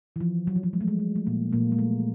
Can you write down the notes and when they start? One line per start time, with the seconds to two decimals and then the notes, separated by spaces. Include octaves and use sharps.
0.16 E3
0.20 F3
0.47 F#3
0.56 F3
0.63 F#3
0.73 G#3
0.81 A3
0.88 G#3
0.99 A3
1.16 A3
1.27 A#2 A#3
1.53 A#2 A#3
1.72 G#3
1.78 A3